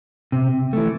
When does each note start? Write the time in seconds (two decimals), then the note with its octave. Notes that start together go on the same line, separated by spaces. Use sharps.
0.32 C3
0.73 E3 A3